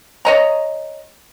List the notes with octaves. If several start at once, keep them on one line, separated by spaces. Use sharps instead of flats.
C#5 D#5 A#5